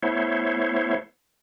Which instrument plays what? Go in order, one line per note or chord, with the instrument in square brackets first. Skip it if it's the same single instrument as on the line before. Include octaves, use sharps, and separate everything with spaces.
[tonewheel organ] A3 B3 E4 C5 C#5